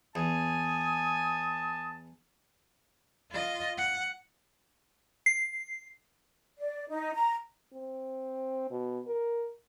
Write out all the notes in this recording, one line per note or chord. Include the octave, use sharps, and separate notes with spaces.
E2 G#5 A5 D#6
F4 D#5
F#5
C7
D5
D#4
A#5
C4
B2
A#4